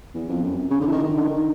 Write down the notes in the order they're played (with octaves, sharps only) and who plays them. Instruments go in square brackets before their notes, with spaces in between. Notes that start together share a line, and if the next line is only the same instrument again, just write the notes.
[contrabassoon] E2
F2
F#2
C#3
D3
E3
D#3
D#3
D3
D#3